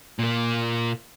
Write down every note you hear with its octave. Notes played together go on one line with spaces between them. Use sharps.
A#2 A#3